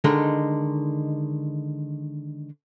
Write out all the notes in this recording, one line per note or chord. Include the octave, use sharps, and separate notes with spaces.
D3 D#3 G#3 D#4